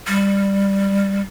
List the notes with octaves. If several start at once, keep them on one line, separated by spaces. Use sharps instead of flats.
G3